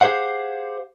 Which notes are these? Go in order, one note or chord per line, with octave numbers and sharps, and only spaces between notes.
G4 G#4 C5 F5 F#5